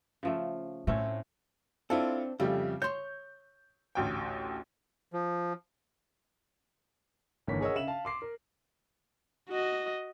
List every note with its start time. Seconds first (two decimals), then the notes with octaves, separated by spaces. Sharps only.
0.23 C#3 F3 A3
0.87 A2 A3 C4 C#4
1.90 C4 D4 E4 F4 A4
2.40 F2 C#3 G3 A3 G4
2.82 C#5 C6 G6
3.95 A1 D2 G5
5.13 F3
7.47 G1 D#2 E3 A#4 C#5 B6
7.61 G#4 A#4 C#5 D#5 F#5 E6
7.75 C#3 E5 F5 E7 F#7
7.87 F5 A5
8.05 C6 D6 C7
8.22 A#4
9.50 F#4 D#5